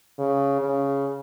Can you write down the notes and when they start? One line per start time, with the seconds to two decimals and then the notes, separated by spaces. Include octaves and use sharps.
0.19 C#3
0.62 C#3